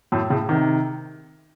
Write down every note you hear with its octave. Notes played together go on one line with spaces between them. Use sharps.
F#2 A2
A2 C#3
C3 D#3